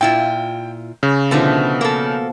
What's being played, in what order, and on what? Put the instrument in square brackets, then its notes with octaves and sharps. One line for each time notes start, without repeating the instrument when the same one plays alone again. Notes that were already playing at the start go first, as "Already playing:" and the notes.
[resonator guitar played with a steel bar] A#2 E4 F4 [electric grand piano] G5
[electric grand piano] C#3
[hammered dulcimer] B2 F3 [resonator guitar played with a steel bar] D3 A3 D#4
[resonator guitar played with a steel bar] A#3 A4